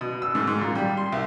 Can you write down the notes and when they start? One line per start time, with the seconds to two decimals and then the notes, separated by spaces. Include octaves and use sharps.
0.01 B2
0.22 E6
0.35 G#2
0.47 G#2
0.61 A#2
0.75 G3
0.97 C6
1.12 C2